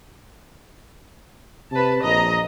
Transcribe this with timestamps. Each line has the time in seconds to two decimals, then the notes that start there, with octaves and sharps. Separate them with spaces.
1.72 C3 B4 A5
2.04 A#1 D#5 A#5